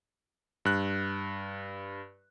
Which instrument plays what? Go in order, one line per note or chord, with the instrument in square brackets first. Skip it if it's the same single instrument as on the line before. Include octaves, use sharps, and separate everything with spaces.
[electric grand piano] G2 F#6